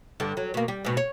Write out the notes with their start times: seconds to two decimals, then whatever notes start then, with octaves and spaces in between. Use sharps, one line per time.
0.20 G2 D3
0.37 F#3
0.54 B2 A#3
0.68 G3
0.85 G#2 B2
0.97 C#5